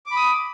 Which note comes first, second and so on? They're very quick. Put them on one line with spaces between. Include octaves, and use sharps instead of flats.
D6 B5 D#6